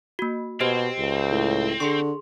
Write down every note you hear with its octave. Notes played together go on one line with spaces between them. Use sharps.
A#3 F#4
B2 C4 G4 C5 D#5
C#2
A2
D3 G#4 C6 C#6